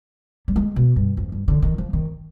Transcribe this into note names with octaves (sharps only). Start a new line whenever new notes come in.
G3
G#3
B2
G2
F2
G2
D3
D#3
F3
D#3